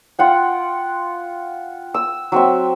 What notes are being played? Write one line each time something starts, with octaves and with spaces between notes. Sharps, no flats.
F4 F#5 G5
E6
F#3 C4 E5